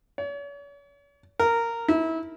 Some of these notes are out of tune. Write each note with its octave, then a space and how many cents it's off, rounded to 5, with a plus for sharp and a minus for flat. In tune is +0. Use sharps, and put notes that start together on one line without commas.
C#5 +45
A#4 -10
E4 -25